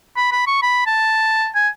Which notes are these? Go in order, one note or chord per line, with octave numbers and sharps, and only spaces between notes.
B5
B5
C#6
B5
A5
G#5